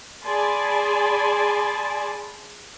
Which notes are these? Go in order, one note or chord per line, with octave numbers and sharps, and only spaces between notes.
G#4 D5 G#5 A5 B5 C6